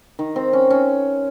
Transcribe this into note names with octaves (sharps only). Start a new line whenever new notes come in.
D#3
C4
C#4
C#4